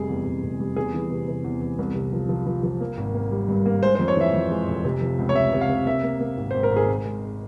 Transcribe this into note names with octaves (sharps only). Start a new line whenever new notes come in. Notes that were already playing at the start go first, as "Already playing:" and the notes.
Already playing: F1 G3 G#4
E2
F1
F1
G3
E2 G#4
E3
C3
C3
E2
E2
C2
C3
F3
F3
F3
F3
A#3
G#1
A#3
G3
G2
A#3
G#3 C5
F2 C5
C#5
E3 E5
F2
G#3
F1
C3
F3
C#2
C#5
C#2 E5
C3
F5
C3
A#3 E5
A#3
A#3
G#1
G#1 C5
A#4
G#1 G#4
G#3
G#3